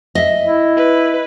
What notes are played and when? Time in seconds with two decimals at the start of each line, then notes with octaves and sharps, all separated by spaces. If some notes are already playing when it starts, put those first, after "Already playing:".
0.15 D#5 E5
0.45 E4
0.77 B4